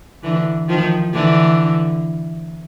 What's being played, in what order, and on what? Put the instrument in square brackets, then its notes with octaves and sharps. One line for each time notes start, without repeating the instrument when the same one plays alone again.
[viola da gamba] D3 E3
D#3 F3
D3 E3